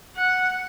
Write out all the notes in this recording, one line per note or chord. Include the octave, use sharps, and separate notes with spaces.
F#5